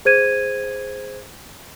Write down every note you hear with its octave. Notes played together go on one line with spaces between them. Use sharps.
G#4 C5 G#6 D#7